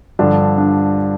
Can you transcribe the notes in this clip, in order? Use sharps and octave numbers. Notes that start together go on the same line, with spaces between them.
G2 D3 F3 D4
D4